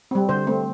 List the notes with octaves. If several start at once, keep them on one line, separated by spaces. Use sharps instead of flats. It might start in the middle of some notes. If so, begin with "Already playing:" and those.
G3 C4
D3 C5
A3 C4